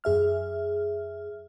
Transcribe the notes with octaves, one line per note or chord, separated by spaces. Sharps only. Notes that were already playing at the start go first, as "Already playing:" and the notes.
F#2 G#4 E5 F6